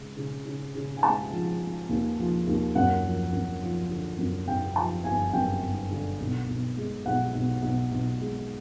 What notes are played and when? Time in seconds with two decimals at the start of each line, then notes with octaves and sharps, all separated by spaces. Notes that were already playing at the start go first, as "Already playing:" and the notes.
Already playing: C#3 G#3
0.17 C#3
0.46 C#3
0.75 C#3
0.97 G#5
1.03 G#3 A5
1.31 F3
1.60 G#3
1.89 D#2
2.19 F3
2.47 D#2
2.75 F#2 F#5
3.03 F3
3.32 F#2
3.61 F3
3.90 D3
4.18 F#2
4.47 F#2 G5
4.76 F3 A5
5.04 G1 G#5
5.33 F#2 G5
5.62 G1
5.91 D3
6.20 B1
6.48 B1
6.77 G#3
7.05 B1 F#5
7.35 B1
7.62 B1
7.92 B1
8.20 G#3